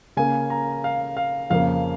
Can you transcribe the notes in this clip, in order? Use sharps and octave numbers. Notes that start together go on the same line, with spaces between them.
C#3 A#3 G#5
A#5
F5
F5
F2 C#3 F3 A#3 F5